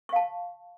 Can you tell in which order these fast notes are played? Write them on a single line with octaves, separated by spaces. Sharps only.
C#6 F5 A5